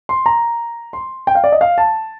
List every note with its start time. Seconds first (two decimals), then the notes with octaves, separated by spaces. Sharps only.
0.09 C6
0.26 A#5
0.93 C6
1.27 G5
1.35 F5
1.44 D5
1.52 D#5
1.61 F5
1.78 A5